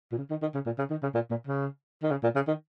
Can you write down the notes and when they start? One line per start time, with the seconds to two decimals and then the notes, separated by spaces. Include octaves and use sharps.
0.12 A#2
0.18 C#3
0.30 D#3
0.42 D#3
0.54 C#3
0.66 A#2
0.78 C#3
0.90 D#3
1.02 C#3
1.14 A#2
1.31 A#2
1.47 C#3
2.03 D#3
2.11 C#3
2.23 A#2
2.35 C#3
2.48 D#3